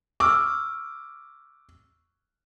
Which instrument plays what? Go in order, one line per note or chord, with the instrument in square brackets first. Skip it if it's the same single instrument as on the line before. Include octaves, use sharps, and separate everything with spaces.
[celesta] C#6 E6 F6 [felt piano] D6